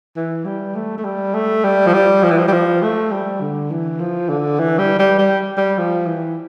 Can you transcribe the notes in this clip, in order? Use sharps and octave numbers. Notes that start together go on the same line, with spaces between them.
E3
G3
A3
A3
G3
A3
G3
F3
G3
F3
E3
F3
G3
F3
A3
G3
D3
E3
F3
D3
E3
G3
G3
G3
G3
F3
E3